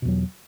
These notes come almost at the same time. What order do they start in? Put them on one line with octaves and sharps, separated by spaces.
B2 E2 F#3